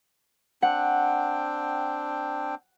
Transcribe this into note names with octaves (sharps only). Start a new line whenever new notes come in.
C4 D4 F#5 G5